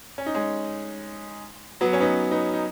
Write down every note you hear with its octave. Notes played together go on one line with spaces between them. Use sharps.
C#4
D#4
G#3 C#4
F#3 B3
C#4
B3 D#4
B3 D#4
D#4